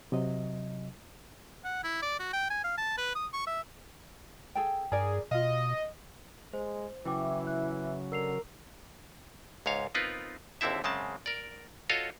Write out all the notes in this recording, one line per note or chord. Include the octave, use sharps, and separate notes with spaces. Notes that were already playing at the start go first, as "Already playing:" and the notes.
C3 F#3 D#5
F#5
E4
D5
F#4
G5
G#5
F5
A5
B4
D#6
C#6
E5
G#4 A4 G5
G2 G#4 A#4 D5
B2 F4 D#5 F5
G#3 C5
C#3 E3 F#3 E4 E5 G5 D6
F#6
D3 A#4 E6 C7 F7
C#2 G#2 C#5 F5
B3 C4 D#4 F4 A#4 B4
G#1 D#2 D3 C4 E4 E5
F#2 C#3 G#3 C4 A5
A#4 D5
F4 F#4 A4 C#5 D#5 F5